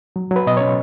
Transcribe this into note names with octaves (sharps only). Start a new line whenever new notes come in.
F#3
F#3 B4
B2 D#5
C#4 C#5